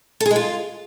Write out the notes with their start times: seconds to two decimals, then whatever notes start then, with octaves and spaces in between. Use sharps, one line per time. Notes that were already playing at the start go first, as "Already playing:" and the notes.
0.20 A4
0.26 G#4
0.31 G#3
0.36 F4